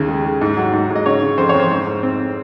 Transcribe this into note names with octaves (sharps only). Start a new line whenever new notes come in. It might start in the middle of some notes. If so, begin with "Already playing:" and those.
Already playing: D#2 C#3
G#3
G#3
G#2
F#3
G#2
G#2
D#5
C#3 C#5
C#3
F2 C5
F2 C#5
C5
G#2
G#2
C4